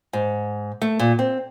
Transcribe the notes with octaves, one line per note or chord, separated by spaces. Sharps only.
G#2
A3
A#2
C4